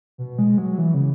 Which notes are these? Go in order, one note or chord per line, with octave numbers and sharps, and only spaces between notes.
B2
G#3
F#3
F#3
E3
C#3